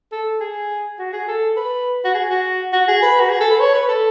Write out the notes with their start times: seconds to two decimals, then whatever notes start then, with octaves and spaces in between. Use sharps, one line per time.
0.12 A4
0.40 G#4
0.99 F#4
1.13 G#4
1.28 A4
1.57 B4
2.05 F#4
2.14 G#4
2.30 F#4
2.73 F#4
2.88 G#4
3.02 B4
3.20 F#4
3.29 G#4
3.40 A4
3.50 B4
3.60 C#5
3.75 B4
3.88 A4